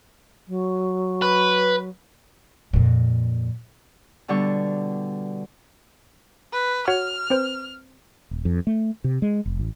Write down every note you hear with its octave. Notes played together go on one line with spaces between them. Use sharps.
F#3
B4
F2 A#2
B2 D3 G3 D4 G5 C#6
B4
F#4 C#5 F#5 F6
C4 B4 C5
D#1
F2
A3
C3
G#3
F1
A1